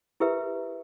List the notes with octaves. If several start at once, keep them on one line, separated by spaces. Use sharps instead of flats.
E4 G4 A#4 B4 E5